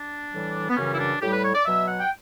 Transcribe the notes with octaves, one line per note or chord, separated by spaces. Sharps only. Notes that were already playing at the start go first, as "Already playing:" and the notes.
Already playing: D4
A2 E3 G3
B3
F#2 C#3 E3 G3 C#4
E4
D4
A2 G3 G4
B4
C#5
D5
B2 F#3 E5
F#5
G5